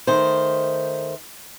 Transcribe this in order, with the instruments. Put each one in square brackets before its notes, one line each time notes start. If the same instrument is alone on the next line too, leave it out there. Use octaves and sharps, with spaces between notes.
[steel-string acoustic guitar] D#3 A3 C5